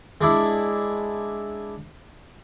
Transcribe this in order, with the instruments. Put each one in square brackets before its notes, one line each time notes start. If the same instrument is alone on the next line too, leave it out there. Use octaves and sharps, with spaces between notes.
[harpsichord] G#3 D4 E4